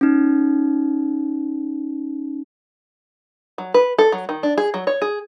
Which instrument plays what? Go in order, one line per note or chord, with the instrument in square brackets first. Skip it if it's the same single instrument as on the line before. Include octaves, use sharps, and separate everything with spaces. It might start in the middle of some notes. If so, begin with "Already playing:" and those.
[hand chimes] C#4 D#4
[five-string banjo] F#3
B4
A4
F#3
D#3
D4
G#4
F#3
C#5
G#4